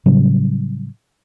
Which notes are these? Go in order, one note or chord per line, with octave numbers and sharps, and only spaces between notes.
A2 C#3 F#3 G3